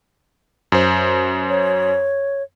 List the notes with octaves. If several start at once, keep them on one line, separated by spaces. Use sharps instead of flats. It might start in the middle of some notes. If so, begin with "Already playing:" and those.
F#2 C5
C#5